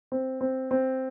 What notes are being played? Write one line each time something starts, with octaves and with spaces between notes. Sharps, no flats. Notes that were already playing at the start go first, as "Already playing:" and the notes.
C4
C4
C4